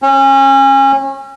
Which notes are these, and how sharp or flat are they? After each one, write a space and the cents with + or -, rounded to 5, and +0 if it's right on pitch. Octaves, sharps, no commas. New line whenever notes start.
C#4 -30